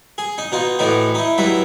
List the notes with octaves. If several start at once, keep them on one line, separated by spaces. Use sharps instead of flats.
G#4
D#4
B2 D#4 F4
A2 E3 D#4 F#4
D#4 E4
G2 F#3 D#4 E4 E5